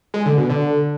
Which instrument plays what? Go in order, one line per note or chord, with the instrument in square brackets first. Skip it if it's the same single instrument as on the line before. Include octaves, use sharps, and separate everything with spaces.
[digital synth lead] G#3
D3
B2
D3